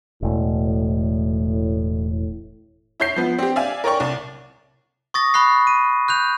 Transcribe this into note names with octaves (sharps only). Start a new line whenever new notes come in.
E1 A2
E4 C#5 G6 C7
F3 B3
C4 G4
D5 E5 F5 G#5
A#4 C#5 D5 G5 C#6
C2 D5
C#6 D#6 A6 A#6
B5 C#6 F#6 C7
D#7
F#6 G6 F7